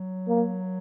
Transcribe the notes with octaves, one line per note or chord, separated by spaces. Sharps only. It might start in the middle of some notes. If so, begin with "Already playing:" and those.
Already playing: F#3
A#3